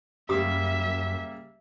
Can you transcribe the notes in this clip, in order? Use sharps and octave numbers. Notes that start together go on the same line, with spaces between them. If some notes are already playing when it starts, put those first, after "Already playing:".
F#2 C#3 G3 A#3 G4 E5 D#6